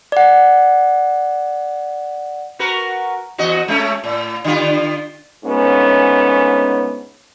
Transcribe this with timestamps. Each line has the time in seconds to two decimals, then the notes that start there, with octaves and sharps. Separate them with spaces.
0.12 D5 F#5
2.59 F#4 A#4 B4
3.38 E2 F#4 D#5
3.68 G#3 A3 C#4
4.04 A2
4.44 D3 G3 F4
5.45 D2 G#2 B3 C#4